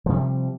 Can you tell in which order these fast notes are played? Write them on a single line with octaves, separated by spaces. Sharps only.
F3 C3 G3